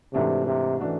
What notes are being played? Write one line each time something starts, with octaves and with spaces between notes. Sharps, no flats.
G#2 C3 E3 A3 D4 F#4
C3
E3 A3 D4 F#4